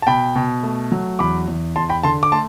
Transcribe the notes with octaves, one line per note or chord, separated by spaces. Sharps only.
A5
B2 G5 B5
B2
A3
F#3
E2 B5 D6
E2
E2 A5 C6
G5 B5
D3 A5 C6
D6
A3 A5 C6